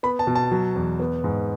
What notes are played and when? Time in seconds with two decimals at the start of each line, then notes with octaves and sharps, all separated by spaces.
0.03 B3 B5
0.19 A5
0.27 B2
0.35 A5
0.51 F#3
0.76 E2
1.00 B3
1.24 G#2